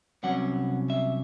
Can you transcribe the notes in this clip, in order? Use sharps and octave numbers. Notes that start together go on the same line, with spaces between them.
C2 C3 F#3 C#4 F#5
E5